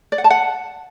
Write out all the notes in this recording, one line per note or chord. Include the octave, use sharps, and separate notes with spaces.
D5
F#5
A5
F#5